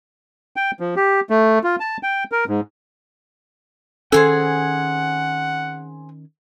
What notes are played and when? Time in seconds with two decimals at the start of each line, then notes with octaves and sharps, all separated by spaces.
0.56 G5
0.80 F3
0.96 G4
1.30 A3
1.64 F4
1.80 A5
2.03 G5
2.32 A#4
2.48 G#2
4.12 D#3 C4 C#4 G#4 A4 F#5 G#5